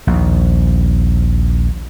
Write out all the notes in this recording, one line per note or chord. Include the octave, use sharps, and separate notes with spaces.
A#1 D#2